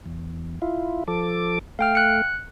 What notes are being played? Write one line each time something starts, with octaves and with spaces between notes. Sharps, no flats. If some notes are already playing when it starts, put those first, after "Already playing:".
E2
E4 F4
F3 A4 D6
A3 F5 G5 F6
F#6 C#7